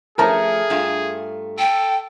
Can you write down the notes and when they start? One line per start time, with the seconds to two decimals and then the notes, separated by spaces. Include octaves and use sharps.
0.18 F3 A3 C#4 G#4 A#4 A5 A#5
0.70 G2 A3 F4
1.59 A4 G5